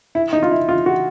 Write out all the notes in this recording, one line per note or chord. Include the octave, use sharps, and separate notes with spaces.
E4
D#4
F4
E4
F4
F#4